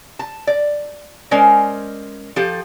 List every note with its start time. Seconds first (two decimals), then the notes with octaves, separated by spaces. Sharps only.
0.19 A5
0.47 D5
1.31 G#3 C#4 A#4 C5 D5
2.36 F3 G4 A4